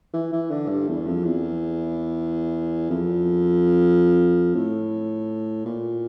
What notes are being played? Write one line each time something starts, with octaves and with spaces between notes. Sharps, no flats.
E3
E3
D3
G2
E2
F2
E2
F2
A2
A#2